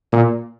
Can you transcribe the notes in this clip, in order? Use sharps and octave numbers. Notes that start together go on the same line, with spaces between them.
A#2